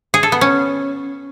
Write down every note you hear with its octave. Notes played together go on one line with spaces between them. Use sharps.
G#4
A4
B3
C#4